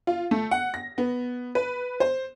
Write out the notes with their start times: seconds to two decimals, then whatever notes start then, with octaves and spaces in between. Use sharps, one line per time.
0.07 F4
0.31 A3
0.51 F#5
0.74 A#6
0.98 B3
1.55 B4
2.00 C5